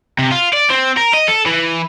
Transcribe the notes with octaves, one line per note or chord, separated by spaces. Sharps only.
C3
F4
D5
C4
A#4
D#5
A4
E3